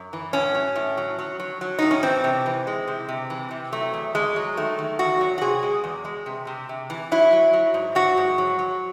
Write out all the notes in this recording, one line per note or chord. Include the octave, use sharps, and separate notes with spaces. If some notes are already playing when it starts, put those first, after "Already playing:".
Already playing: F#2
E3
A2 C#4
F#3
A2
F#3
F#3
F#3
F#3
A2 D#4
C#4
E3 C4
C3
E3
G#3
C3
C3
E3
C3
F#3 A3
E2
E2 G#3
F#3
D#3 A3
D#3
E2 F#4
F#3
F#4
C3 G#4
G#3
E2
G#3
C3
C3
C3
E3
F#3 E4
F#3
F#3
G#2
F#3 F#4
G#2
F#3
F#3